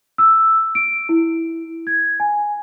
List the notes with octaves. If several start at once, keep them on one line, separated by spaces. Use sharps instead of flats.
E6
D7
E4
G#6
G#5